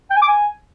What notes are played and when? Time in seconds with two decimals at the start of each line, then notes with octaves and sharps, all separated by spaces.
0.10 G5
0.16 G#5
0.22 D6
0.28 G#5